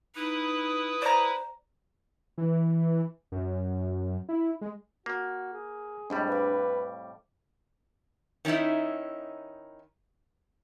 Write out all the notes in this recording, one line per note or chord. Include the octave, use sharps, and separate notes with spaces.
D#4 E4 B4 D#6
C5 D5 A#5
E3
F#2
E4
G#3
A#3 F#4
G#4
F2 A2 G3 G#3 D4 G#4 C5
B4 F5 D6
D#3 C#4 D#4 E4 E5